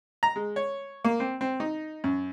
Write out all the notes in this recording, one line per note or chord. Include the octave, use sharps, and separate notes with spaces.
A#5
G#3
C#5
A#3
C4
C4
D#4
F#2